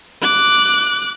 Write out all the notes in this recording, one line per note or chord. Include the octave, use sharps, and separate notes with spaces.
D6 F#6